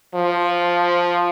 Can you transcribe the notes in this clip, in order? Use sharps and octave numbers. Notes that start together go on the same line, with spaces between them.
F3